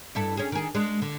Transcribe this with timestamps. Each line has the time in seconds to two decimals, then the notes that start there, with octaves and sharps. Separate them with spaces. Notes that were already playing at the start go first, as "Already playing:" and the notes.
0.15 G2 E4 A4
0.37 C#4 G#4
0.52 D#3 G#4
0.75 G#3 D4
1.02 D3